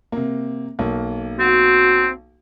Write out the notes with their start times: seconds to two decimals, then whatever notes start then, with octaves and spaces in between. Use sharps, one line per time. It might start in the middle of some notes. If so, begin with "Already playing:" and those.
0.12 C3 A#3
0.79 B1 A#3
1.40 C4 F#4